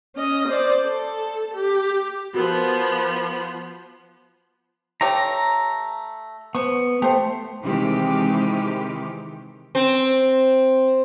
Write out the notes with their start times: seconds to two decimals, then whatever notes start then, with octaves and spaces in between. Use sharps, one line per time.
0.16 C#4 D#5
0.48 C5 D5
0.85 A4
1.54 G4
2.34 F3 B3 F#4 A#4
5.01 A3 G4 C#5 A#5
6.55 B3 C5 C#6
7.02 A3 G4 C5
7.63 C3 D#3 E3 G#3 C4 G4
9.75 C4